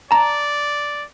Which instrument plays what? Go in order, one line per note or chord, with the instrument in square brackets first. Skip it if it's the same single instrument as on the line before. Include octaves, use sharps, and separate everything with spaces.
[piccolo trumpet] D5 [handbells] A5 A#5